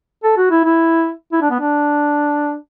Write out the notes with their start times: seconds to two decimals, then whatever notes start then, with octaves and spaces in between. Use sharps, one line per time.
0.24 A4
0.37 F#4
0.51 E4
0.64 E4
1.33 E4
1.42 D4
1.51 B3
1.60 D4